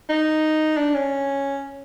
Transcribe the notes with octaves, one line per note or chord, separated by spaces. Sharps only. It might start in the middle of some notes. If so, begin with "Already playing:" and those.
D#4
D4
C#4